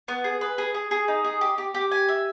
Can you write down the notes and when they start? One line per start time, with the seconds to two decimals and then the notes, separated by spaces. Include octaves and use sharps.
0.08 B3
0.24 G#4
0.41 B4
0.58 G#4
0.74 G#4
0.91 G#4
1.08 D#4
1.24 G#4
1.41 G4
1.58 G4
1.74 G4
1.91 G#5
2.08 E5